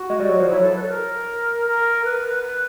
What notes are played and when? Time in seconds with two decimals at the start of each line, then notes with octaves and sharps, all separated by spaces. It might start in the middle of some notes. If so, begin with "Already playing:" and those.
Already playing: F#4
0.10 G#3
0.20 G3
0.29 F#3
0.40 F3
0.49 F#3 E4
0.62 A4
0.76 B4
0.82 A4
0.89 A#4
1.66 A#4
2.05 B4